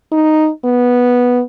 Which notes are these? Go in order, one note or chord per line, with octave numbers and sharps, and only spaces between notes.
D#4
B3